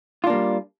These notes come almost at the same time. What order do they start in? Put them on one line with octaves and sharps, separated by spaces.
F4 D4 A#3 G3